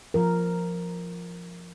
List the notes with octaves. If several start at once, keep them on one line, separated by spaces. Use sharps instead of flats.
F3 A#4